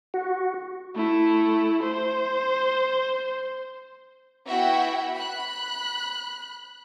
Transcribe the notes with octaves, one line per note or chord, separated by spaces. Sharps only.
F#4
A3 E4
C5
B3 E4 F#4 E5 F#5 G5
B5 F#6